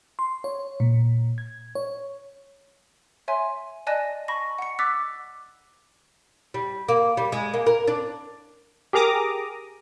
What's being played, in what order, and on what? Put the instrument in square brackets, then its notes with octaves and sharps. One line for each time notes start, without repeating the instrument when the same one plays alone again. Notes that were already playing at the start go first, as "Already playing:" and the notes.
[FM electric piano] C6
C#5
A#2
G#6
C#5
[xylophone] C#5 E5 G#5 C6
D5 D#5 G#5 A5 F#6 A#6
A5 B5 C#6 A#6
F#5 C#7
D6 E6 F#6 A6 B6
[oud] G3
A#3
G3
G#3
A#3
A#4
D4
[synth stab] G4 G#4 A#4 A#5 D6 D#6